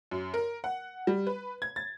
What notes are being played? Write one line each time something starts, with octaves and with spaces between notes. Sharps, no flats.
F#2
A#4
F#5
G3
B4
G#6
A6